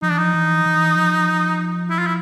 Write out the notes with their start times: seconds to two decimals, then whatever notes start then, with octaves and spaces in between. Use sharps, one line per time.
0.02 F3 D#4
0.10 E3 D4
0.17 F3 D#4
0.33 E3
0.65 E3
0.96 F3
1.90 E4
1.99 F4
2.06 E4